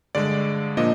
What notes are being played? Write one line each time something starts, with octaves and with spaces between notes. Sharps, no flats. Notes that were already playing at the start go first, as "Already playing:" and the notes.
G2 D3 G#3 D5
A#2 F3 A#3 D4 D#5